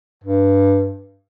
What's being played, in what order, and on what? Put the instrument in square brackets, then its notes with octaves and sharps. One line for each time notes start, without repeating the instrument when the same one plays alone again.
[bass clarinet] G2